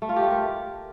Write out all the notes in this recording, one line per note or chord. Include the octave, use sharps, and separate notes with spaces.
A3
F4
G4
A3
A#4